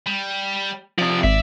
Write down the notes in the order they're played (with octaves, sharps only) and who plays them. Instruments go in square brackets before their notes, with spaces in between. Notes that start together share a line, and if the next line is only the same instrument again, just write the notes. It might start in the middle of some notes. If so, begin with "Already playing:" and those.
[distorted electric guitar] G3
[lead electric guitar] C3 F3 [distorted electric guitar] D5
[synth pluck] G#1 [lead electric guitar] E5